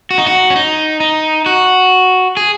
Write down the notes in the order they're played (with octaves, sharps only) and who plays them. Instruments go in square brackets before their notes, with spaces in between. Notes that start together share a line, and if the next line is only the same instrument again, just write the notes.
[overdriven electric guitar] F#4
D#4
F#4
C#4
D#4
D#4
F#4
G#4